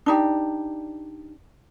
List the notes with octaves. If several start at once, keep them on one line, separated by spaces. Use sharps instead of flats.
D4 D#4 G4